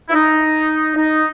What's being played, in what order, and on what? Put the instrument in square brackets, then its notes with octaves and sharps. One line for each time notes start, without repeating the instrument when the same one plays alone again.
[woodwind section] E4
D#4
D#4